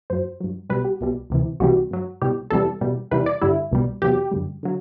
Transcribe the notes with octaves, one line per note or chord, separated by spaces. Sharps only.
F#2 F#3 C5
G2 F#3
C2 B2 G3 B4
G4
C2 B2 G3
D2 C3 E3
C2 C3 E3 G3 F#4
G2 F#3
C2 B2 G3 G4
E2 C3 E3 G3 A4
E2 B2 G3
E2 C3 E3 G3 B4
D5
G2 D3 G3 E4
C2 B2 G3
E2 C3 F#3 G4
F#2 D3 G3
D3 F#3